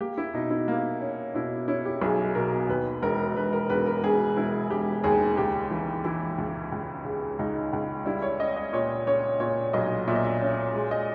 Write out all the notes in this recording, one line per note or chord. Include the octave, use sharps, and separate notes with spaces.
A#3 G4
E4
B2 D#4
E4
A#3
C#4
B2 E4
C#4 E4
G4
B1 G#4
B2 A#4
D#2 B4
E1 A#4
E1 B4
A#4
E1 B4
A#4
E1 G#4
E1 E4
E1 G4
D#2 G#4
C#2 G4
E3
E3 E4
C#2
C#2
C#3
C#2 D#4
C#2
G3 E4
C#5
C#4 D#5
D#5
A#2 C#5
C#4 C#5
A#2 C#5
B1 D#5
A#2 E5
D#5
E5
C#4
G#3
D#5